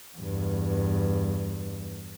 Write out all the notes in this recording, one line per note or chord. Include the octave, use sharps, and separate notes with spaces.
E2 G2